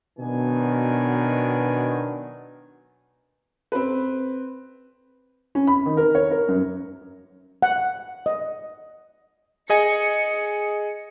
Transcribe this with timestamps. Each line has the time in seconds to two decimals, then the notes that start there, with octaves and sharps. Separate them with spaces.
0.18 B2 D#3 F#3 B3 D4 G#5
3.72 C4 B4
5.55 C#4
5.67 B5
5.86 D#3
5.97 A#4
6.15 C#5
6.31 A#4
6.48 F#2
7.62 F#5
8.26 D#5
9.70 G#4 D#5 G#5 C#7